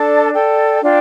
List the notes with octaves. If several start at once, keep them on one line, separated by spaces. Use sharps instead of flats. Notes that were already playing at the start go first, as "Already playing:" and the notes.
Already playing: D4 A4 D5 A5
A4 D5 G5
D4 F4 D5 G5